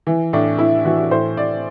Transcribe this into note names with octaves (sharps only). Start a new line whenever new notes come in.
E3
A2 D4
A2 E4
E3 F#4
F#4
A2 C5
A2 D5